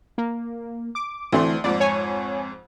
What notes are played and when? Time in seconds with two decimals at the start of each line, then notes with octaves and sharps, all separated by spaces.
0.18 A#3
0.95 D6
1.32 D2 E3 A3 C4 D4 C6
1.64 F2 G#2 D5
1.80 C#5 G#5